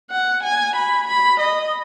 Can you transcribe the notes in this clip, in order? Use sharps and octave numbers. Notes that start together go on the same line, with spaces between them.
F#5
G#5
B5
B5
D#5